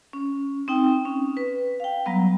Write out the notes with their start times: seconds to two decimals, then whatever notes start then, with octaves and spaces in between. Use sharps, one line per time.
0.13 C#4
0.68 C4 D#4 G5
1.05 C#4
1.37 B4
1.80 F5 G5
2.06 F#3 G3 B3 A#5